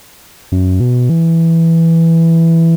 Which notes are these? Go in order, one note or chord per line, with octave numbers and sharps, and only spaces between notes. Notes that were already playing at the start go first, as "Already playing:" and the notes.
F#2
B2
E3